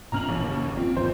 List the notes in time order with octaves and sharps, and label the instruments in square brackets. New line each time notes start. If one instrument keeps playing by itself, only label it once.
[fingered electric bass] D1 A#2 C#4 [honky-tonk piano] A#5 F6 F#7
[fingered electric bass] A#1 E3 C#4 [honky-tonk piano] D#2
[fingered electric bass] F#1 C#3
[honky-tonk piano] A#2 [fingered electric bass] C4
[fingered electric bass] G1 D#2 F3 [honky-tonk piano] C5